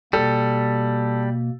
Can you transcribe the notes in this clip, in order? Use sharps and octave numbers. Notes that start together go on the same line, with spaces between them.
B2 G3 A#3 A4